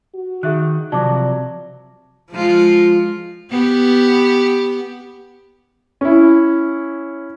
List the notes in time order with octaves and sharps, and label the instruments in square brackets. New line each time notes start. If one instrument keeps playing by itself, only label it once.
[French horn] F#4
[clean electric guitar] D#3 [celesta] G#4 E5 F#6
[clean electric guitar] C3 F3 F#3 [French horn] D5 [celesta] A5 D6 A#6
[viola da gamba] F3 G#3 F4
B3 G4
[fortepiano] C#4 E4